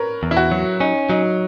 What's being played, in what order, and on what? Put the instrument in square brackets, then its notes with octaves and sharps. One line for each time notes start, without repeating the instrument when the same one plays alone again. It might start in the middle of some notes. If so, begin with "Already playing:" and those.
Already playing: [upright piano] A#4 B4 C#5
[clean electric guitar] E2
[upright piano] E4
F#4
[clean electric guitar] F#3
[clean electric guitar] C#4 [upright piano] D#4
[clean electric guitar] F#3 [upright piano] D#4